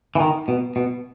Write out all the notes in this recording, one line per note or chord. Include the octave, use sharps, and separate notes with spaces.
E3
D#3
B2
B2